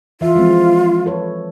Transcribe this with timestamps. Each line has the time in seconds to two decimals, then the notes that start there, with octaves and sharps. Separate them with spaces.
0.21 E3 F4 E5
0.36 F3 G#3 C4
1.06 A4 B4 C#5